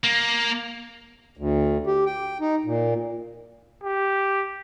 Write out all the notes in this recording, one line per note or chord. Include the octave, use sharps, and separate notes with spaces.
A#3
D2
G4
G5
D#4
A#2
G4